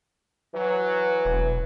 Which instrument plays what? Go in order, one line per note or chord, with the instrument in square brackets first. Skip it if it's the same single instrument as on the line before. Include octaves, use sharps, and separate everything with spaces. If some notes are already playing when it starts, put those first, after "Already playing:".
[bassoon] E3 [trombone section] F#3
[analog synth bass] E1